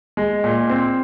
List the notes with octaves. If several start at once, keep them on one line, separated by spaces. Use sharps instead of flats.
G#3
A#2
C4